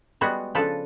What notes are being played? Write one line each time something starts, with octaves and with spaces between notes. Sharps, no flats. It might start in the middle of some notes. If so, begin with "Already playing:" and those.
G3 G#3 B3 F#4 G#4
C#3 F3 D4 A4 B4 A5